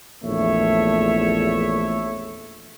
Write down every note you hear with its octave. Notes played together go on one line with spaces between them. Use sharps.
A#1 E2 A3 C#5 E5